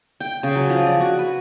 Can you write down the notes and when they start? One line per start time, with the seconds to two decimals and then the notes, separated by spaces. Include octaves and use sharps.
0.20 G5
0.43 C#3
0.56 F#3
0.70 F3
0.86 D5
1.00 F#4
1.19 B4